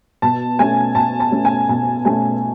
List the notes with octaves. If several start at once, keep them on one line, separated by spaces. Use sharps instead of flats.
B2 A5
A3 C#4 G#5
B2 A5
A5
A3 C#4
G#5
B2 G#5
A3 C#4 G#5